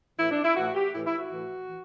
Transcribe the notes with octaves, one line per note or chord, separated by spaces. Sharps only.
A2 E3 E4
D4
E4
A2 E3 F#4
G4
A2 E3 E4
E4
F#4
A2 E3
E3